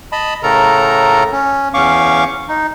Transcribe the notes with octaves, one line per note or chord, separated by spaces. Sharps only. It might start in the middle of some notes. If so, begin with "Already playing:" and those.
D#5 A5 B5
A2 C#3 A4 A#4 A#5
C#4
E2 C#4 F5 C#6 D6
D#4